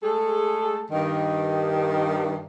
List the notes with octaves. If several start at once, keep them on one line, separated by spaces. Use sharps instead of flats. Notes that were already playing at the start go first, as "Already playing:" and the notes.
G#3 A3 G#4 A4
G2 D#3